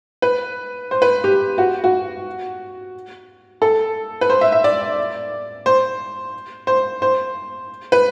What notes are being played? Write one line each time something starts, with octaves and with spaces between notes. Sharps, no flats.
B4
C5
B4
G4
F#4
F#4
A4
B4
C5
E5
E5
D5
C5
C5
C5
B4